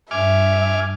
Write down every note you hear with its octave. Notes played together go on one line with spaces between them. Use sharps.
G2 E5 G#5 D6 F6